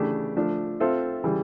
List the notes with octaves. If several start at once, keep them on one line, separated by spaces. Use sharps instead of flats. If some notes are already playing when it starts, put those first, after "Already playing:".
Already playing: C#3 E3 A3 D4 G4
F3 A3 D4
C4 F4 A4 C5 E5
C#3 E3 G3